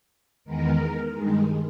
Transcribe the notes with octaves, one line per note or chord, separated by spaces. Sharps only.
E2 D#3 G#3 B3 A#4
G2 D#3 G#3